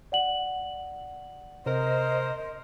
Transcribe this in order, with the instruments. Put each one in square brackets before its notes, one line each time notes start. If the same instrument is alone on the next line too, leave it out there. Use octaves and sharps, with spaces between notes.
[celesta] D5 F#5 F#7
[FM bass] C3 [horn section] A#4 C5 [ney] D#5